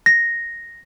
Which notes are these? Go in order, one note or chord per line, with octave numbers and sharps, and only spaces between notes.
A#6